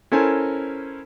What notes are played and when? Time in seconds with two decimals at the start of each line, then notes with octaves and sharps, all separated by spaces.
0.12 C#4 E4 A4 A#4 C5 G#5